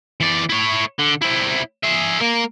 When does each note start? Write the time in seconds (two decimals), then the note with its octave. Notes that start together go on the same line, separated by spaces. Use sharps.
0.20 E3 D5
0.49 E4 C#5
0.99 D3
1.21 C4 E4
1.84 G#4 E5
2.21 A#3 A#4